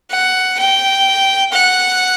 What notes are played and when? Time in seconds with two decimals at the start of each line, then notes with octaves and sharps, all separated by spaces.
0.11 F#5
0.59 G5
1.52 F#5